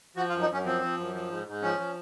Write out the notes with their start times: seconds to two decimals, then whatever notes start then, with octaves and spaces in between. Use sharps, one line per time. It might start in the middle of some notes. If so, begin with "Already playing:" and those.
0.16 F3 F#4
0.29 F4
0.33 F#2
0.41 D#4
0.49 F#2 C#4
0.65 F3 C4
0.82 F3
0.97 F#2
1.13 F3
1.30 G#2
1.47 G#2
1.62 F3 C#4
1.78 F3